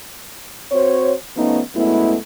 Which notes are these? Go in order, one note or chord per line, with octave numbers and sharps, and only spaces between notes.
C4 F#4 C5 C#5
F3 A3 B3 C#4 D#4
F#2 G#3 A3 B3 E4